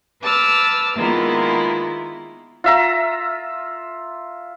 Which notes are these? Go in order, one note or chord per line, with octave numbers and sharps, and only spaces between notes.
B4 A5 D6 E6 F6
D#3 G#3 A#3 B3 E4 F4
F4 E5 A#5